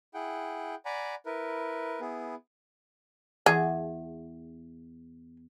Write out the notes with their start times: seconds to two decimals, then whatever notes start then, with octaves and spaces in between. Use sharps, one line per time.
0.14 E4 G#4 F#5 G5
0.86 D5 F#5 G#5 A#5 B5
1.26 E4 A#4 B4
2.01 B3 E4 G#4
3.46 E2 G#4